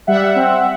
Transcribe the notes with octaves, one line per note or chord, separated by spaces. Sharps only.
G3 E5 F#5
C4